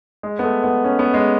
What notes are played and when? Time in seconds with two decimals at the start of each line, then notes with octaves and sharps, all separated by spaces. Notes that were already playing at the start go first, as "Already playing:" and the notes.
0.23 G#3
0.39 B3
0.44 A3
0.64 B3
0.84 C#4
0.99 B3
1.14 G#3